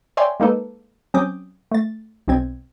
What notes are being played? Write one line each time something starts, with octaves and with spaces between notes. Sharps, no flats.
C#5 D5 E5 G5 G#5 C6
G#3 A#3 D#4 A4 B4
F#3 C4 C#4 D6 D#6 G6
A3 A6
B1 B2 C4 G#6